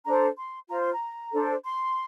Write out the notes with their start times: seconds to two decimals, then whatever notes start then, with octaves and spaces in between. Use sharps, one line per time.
0.04 D4 A4 C5 A#5
0.36 C6
0.69 F4 C5 A#5
0.79 C6
0.92 A#5
1.32 D4 A4 C5
1.64 C6